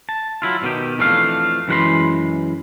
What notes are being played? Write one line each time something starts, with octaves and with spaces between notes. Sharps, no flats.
A5
F#3 E4 F4
B2 D#3 G4
F2 E3 A3 D4 F5
F#2 E3 G#3 F#5 B5 C6